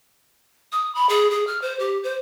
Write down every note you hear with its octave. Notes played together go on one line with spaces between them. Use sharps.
D#6
B5
G#4
G#4
F6
C5
G4
C5